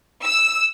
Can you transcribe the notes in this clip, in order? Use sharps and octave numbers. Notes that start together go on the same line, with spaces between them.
E6